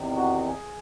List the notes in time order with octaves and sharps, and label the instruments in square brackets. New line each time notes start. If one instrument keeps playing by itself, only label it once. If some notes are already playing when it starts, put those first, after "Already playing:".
Already playing: [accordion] E2 C3 D#3
F#4
G#4